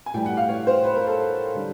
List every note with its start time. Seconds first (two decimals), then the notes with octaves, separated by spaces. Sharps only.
0.06 G#5
0.14 A2 E3 G3 G5
0.26 F#5
0.37 F5
0.49 C#5
0.67 C5
0.84 B4
0.96 A#4
1.07 A4
1.55 D3 G3